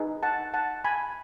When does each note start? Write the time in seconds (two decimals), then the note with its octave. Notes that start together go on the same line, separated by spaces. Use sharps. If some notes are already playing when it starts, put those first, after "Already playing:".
Already playing: D#4 G#4 B4
0.23 F#5 A5
0.54 F#5 A5
0.84 G#5 B5